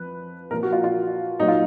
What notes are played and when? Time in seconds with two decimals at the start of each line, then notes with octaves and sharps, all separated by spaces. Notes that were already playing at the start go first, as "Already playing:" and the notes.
Already playing: F2 F3 B4
0.51 A#2 F3 A#4
0.63 F#4
0.73 F4
0.84 F4
1.39 A#2 F#3 D#4
1.48 F4